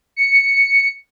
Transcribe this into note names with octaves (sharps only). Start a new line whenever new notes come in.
C#7